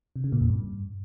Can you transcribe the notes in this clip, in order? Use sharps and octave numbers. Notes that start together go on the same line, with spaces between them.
C3
C#3
A#2
E2
G2